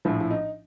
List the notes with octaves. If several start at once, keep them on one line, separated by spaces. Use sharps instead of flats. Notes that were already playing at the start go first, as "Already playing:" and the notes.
A#1 A2 F3 E4
E4
D#4